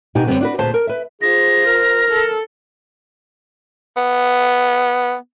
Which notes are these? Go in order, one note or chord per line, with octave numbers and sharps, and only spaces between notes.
B2 D4 D#4 F#4 G4 G#5
F#2 A#2 D3 G3 B3 C4
D4 F#4 B4
D2 A#2 B3 G#4 C5 A5
A#4
B4 E5
F4 G#4 C5 A#6
A#4
A4
B3